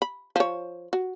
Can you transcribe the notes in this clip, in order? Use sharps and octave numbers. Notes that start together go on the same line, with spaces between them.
B5
F3 C#5
F#4